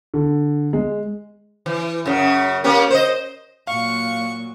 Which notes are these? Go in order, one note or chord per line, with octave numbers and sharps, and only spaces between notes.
D3
G#3
E3
F#2 C#3
A#3 C#4 G4
C5 D#5
A#2 F#3 F5 C#6